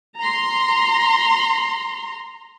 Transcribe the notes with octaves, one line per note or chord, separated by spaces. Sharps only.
A#5 C6